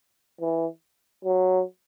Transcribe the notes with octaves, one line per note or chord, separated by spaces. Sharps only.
E3
F#3